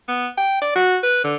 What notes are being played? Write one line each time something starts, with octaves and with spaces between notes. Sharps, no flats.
B3
G5
D5
F#4
B4
D3